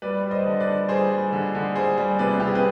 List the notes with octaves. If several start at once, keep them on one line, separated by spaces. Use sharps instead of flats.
G3 B4 D5
G3
C5 D#5
D3
B4 D5
D3
G3 G#4 C5
G3
D3
D3
G3 G#4 C5
G3
C3 B4 D5
C3 G4
G#4
B4